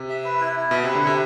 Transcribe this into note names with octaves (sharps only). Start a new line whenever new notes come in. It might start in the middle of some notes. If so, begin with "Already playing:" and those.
Already playing: C3
E5
B4
E4
E4
B2 E5
C3 B4
D3
C3 E4